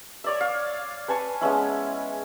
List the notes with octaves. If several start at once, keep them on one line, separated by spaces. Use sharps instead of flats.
C#5 D5 E5
F5
B4 G#5 A5 C#6
G#3 B3 C#4 E4